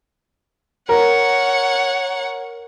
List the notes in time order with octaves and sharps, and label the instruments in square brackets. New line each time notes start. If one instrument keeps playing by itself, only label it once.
[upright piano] A#4 [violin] C#5 F#5